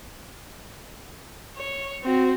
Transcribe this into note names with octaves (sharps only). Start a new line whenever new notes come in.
C#5
C4 F#4